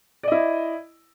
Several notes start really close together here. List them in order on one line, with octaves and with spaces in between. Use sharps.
D5 D#5 E4